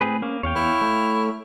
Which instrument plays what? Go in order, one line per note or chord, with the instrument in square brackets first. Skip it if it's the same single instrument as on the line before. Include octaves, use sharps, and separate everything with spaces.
[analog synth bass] A2 [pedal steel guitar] C4 G#4 B4
[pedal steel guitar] A#3 [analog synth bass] C#4
[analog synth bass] E2 [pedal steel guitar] C#5 F5 G5
[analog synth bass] E2 [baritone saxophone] E4
[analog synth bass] A3